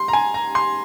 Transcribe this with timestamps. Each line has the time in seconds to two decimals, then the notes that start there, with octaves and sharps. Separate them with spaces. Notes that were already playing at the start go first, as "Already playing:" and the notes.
Already playing: G3 C6
0.08 A#5
0.13 G#5
0.34 A#5
0.55 C6